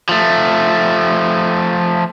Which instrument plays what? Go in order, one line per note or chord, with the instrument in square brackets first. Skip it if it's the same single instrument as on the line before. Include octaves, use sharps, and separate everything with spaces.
[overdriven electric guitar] F3 A3